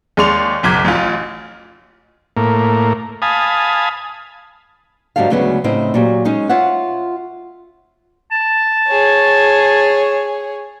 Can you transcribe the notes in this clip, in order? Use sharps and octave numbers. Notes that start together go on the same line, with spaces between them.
D#2 G#3 D5 C6 C#6 F7
F#1 B1 D6 G#6
A1 F4
A2 A#3
F5 G#5 A5 B5 D#6
G#2 D3 F#3 G4 A4 F5
D2 C#3 F#3 G#3 B3 C#4
A2 C#3 C4 D#4 E4
A#2 F#3 G4
G#3 C#4 D#4 G#4
F4 C#5 E5 F#5
A5
G#4 C#5